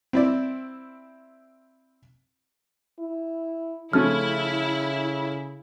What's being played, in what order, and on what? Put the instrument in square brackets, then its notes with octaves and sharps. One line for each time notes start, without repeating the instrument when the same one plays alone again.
[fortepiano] C4 E4 D5
[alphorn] E4
[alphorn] C#3 [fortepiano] F3 A3 C#4 [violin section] E4 [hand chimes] F6